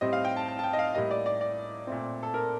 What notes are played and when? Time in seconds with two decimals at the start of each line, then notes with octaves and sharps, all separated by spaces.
0.01 A2 G3 C4 D#5
0.13 F5
0.25 G5
0.37 A5
0.48 A5
0.59 A5
0.64 G5
0.73 D#5
0.79 F5
0.95 A2 G3 A#3 D#5
1.11 D5
1.26 D5
1.41 D5
1.87 A#2 A3 C4
2.23 A4
2.34 A#4